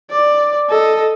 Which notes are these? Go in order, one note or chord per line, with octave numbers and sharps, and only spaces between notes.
D5
A4 D#5